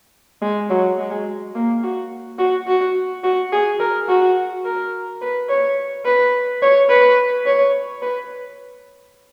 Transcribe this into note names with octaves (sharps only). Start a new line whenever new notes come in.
G#3
F#3
G#3
A#3
F#4
F#4
F#4
F#4
G#4
A#4
F#4
A#4
B4
C#5
B4
C#5
B4
C#5
B4